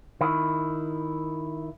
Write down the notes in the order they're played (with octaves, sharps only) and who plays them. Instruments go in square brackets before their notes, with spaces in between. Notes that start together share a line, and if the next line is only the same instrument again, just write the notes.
[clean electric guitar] D#3 E4